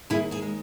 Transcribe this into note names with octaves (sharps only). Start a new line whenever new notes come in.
D#2 E4 G#4
E4 G#4
G#3